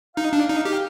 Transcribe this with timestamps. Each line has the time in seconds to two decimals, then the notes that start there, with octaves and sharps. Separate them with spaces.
0.16 D#4 F5
0.33 D4
0.49 D#4
0.65 G4